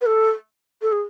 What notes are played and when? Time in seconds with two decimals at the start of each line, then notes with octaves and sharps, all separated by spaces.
0.01 B4
0.06 A4
0.82 A4
0.92 G#4